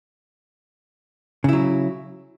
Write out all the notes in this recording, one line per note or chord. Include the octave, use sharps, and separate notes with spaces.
C#3 F#3 E4